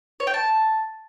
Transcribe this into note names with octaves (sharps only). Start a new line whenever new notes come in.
C#5
G5
A5